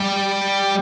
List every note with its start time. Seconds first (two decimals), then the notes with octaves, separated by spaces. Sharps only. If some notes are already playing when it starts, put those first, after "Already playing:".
Already playing: G3